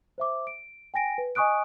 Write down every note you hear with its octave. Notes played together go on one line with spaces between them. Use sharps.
C5 E5 D6
D7
G5 G#5 A#6 D7
B4
D#5 G#5 C#6 D#6 F#6 D7